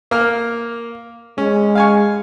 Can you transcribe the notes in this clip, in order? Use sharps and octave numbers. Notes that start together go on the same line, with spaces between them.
A#3 F6
G#3 C#4
F5 G#5 C#6